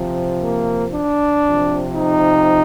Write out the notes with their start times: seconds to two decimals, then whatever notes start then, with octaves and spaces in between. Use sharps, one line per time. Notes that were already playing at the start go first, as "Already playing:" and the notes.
Already playing: C3 F3
0.41 A#3
0.93 D4
1.44 C3 F3
1.95 D#4